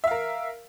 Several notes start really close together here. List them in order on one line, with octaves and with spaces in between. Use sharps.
E5 F5 A#4